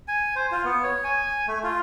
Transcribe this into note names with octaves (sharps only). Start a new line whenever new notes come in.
G#5
C5
F4
B3
C#5
G#5
A3
F4